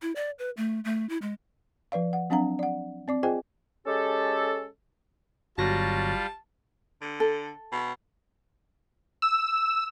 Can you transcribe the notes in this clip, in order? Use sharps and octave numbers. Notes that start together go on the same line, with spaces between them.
E4
D5
B4
A3
A3
E4
G#3
F3 B4 D5 F5
F#5
F#3 C4 D4 F5 F#5 A#5
D5 F#5
C4 D5 D6
F4 G#4 C5 D#5 G5 G#5
G#3 C#4 G4 A4
G1 F#3 G3 F4 F#4 A5 A#6
D3
A4
B2
E6